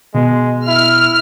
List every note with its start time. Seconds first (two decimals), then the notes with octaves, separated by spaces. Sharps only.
0.14 B2 G#3
0.68 E4 F6